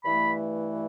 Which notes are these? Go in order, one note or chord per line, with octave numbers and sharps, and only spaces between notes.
G2 E3 A3 B5